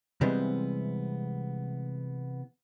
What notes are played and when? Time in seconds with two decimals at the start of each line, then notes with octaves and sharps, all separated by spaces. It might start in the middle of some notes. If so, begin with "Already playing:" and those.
0.21 C3 E3 G3 G#3 B3 C4